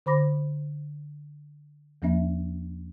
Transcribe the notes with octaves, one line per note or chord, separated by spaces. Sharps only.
D3 C5 B5 D6 A#6
E2 F3 A#3 C#4 E5